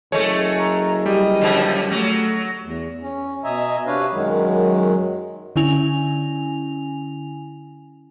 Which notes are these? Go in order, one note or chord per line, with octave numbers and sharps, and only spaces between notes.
F#1 G#3 A3 C#5
A#5
G3 D#5
F#2 D3 F3
F#3 A3 A#6
E2
C#4
B2 D#5 E5 G#5 A#5
C3 D4 B4 C#5 F5
F#2 D#3 F#3 G#3
D3 C#4 E4 G#5 F7